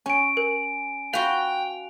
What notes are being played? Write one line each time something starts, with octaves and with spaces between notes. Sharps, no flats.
C#4 G#5 D7
A#4
F4 F#4 B4 F5 G5 F7